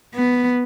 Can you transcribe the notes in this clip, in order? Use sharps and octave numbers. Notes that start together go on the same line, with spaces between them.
B3